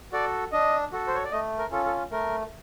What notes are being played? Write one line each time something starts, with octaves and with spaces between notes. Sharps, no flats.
F#4 A4 D5
D4 D#5
F#4 A4
C5
C#5
D5
A3 D#5
A#4
C#4 F4 A4
A4
A3 A#4